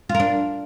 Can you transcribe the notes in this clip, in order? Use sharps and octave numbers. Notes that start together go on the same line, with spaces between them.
F4
A#4
D4